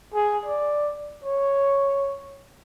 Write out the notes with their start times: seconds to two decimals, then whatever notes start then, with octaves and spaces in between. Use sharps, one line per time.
0.14 G#4
0.45 D5
1.24 C#5